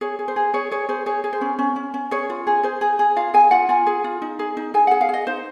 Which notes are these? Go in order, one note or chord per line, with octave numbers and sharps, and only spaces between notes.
G#4 C#5
G#4
C5
G#4
G#4 C#5
G#4 C#5
G#4 C5
G#4 C#5
G#4
C5
C#4
C#4
C#4
C#4
G#4 C#5
F4
G#4
G#4 C5
G#4
G#4
F4 F5
G#4 G#5
F4 F#5
F4 G#5
G#4
F4
D#4
G#4
D#4
G#4 G#5
G#4 F#5
F5
G#4 D#5
D#4 C5